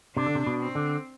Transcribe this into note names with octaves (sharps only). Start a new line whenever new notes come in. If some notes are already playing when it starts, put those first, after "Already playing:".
C3 D4
D3
C3
B2
C4
D3